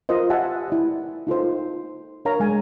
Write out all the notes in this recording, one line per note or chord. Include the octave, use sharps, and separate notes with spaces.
F4 A#4 C5 D#5
G4 E5 F#5 G#5 A5
E4 D5 E5
D#4 F4 A4 C5
D4 A#4 C#5 F5 A#5
G#3 G#5